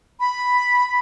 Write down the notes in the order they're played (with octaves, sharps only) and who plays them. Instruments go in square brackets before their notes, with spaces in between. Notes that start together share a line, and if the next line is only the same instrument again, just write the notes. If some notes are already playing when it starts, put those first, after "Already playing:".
[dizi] B5